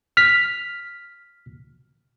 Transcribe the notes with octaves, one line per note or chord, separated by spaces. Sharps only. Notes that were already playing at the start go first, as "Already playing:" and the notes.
F6 B6